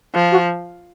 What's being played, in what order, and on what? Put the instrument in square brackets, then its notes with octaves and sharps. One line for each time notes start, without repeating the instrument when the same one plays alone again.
[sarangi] F3
[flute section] F#4